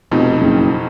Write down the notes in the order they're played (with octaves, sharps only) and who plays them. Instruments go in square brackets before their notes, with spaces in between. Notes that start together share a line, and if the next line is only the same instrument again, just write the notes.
[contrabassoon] F1 [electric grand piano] F2 B2 D#4
[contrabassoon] F#1